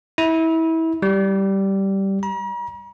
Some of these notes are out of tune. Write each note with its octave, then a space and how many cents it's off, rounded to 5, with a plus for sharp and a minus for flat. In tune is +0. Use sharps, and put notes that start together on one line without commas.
E4 -25
G3 -10
A#5 +45